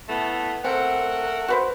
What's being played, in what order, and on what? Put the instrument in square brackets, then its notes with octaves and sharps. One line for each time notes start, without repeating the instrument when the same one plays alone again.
[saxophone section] A2 A3 B3
[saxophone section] A3 A#4 F#5 [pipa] C4
[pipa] F#4 B4 C5